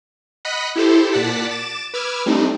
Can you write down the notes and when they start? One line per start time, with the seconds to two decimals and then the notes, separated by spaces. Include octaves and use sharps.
0.45 D#5 F#5 B5 F#6 B6
0.76 E4 G4 A4 C5
1.12 A#2 D5 F#5 A5 B6
1.51 D6 A6 E7
1.94 B4 D6 E6 F6 G#6
2.26 G3 A3 C4 D4 D#4